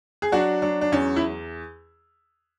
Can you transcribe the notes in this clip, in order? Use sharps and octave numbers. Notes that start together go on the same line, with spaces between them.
G#4
F#3 D4 F#4
F#3 D4
D4
E2 C#4
E4